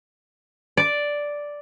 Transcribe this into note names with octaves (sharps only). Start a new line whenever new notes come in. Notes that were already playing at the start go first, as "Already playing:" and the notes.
D5